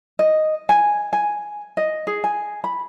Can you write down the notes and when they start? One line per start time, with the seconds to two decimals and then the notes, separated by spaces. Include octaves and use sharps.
0.19 D#5
0.69 G#5
1.13 G#5
1.77 D#5
2.07 G#4
2.24 G#5
2.64 B5